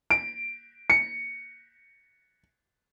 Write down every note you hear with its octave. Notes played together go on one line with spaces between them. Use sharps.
D7
C#7